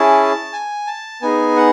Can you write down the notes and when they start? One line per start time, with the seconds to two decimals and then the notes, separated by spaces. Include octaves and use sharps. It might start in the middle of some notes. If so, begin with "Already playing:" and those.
Already playing: C#4 E4 G#4 A5
0.53 G#5
0.87 A5
1.22 B3 D#4 G#4 G#5
1.57 F#5